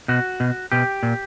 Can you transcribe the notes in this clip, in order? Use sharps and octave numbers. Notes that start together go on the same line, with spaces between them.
B2 F#4
B2
B2 G4
A#2